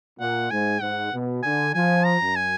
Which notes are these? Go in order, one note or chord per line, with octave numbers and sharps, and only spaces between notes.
A#2 F#5
G#2 G#5
G#2 F#5
B2
D3 G#5
F3 G#5
A#5
F#2
G#5